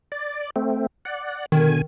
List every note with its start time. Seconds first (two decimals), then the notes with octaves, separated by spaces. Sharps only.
0.12 D5
0.56 A3 C4
1.05 D5 F#5
1.52 B2 D3 D#3 G#5